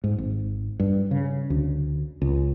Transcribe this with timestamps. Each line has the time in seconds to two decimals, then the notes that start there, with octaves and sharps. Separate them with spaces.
0.04 G#2
0.18 G#1
0.80 G2
1.11 C#3
1.50 D2
2.22 C#2